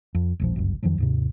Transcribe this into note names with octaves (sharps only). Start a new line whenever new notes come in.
F2
E1 A#1 F3
G1 C#2 F#2
F2 D#3 F3 F#3
D#2 G#2 C3